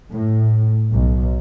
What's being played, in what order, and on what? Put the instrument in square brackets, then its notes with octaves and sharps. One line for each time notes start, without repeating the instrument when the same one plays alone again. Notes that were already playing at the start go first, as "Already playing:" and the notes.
[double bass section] A2
B1